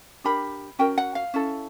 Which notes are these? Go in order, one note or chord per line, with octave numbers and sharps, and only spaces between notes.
D4 G4 A#4 B5
C#4 F#4 A#4 G5
F#5
F5
C#4 E4 A4